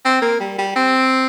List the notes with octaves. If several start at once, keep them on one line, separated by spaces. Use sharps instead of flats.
C4
A#3
G3
G3
C4